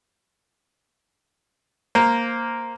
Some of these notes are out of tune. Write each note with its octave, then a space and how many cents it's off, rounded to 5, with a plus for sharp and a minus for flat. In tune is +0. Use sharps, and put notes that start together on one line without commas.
A#3 +0 C5 +0